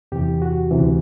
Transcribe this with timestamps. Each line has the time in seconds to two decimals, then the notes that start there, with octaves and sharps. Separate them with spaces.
0.12 E2 C3 E3 G4
0.42 F#4
0.71 D2 C3 E3